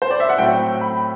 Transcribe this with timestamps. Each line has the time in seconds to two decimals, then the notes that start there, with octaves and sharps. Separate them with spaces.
0.02 C5
0.11 D5
0.20 E5
0.29 F#5
0.38 A2 F#3 A3 C4 G5
0.81 B5